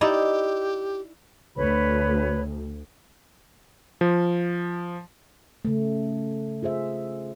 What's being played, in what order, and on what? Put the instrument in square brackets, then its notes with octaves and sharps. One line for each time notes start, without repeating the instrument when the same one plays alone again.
[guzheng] D#4 E4 D5 [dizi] G4
[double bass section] D2 [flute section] B4 C#5 B5
[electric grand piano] F3
[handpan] C#3 A3
F4 G#4 C5 E5